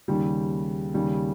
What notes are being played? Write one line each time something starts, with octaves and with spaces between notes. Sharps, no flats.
D#2 C#3 G3
D#2 C#3 G3